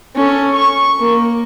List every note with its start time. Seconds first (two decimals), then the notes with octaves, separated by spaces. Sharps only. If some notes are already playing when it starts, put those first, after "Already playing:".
0.15 C#4 A4
0.54 C#6
1.00 A#3